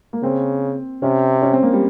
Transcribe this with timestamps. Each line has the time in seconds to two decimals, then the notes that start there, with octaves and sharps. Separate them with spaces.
0.13 A#3
0.23 C#3 C4
1.02 C3 C#4
1.42 C#4
1.53 C4
1.63 A#3
1.73 G3